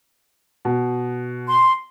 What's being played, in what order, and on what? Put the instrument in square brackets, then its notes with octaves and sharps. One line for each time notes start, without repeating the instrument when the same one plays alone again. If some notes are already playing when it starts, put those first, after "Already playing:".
[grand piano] B2
[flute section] C6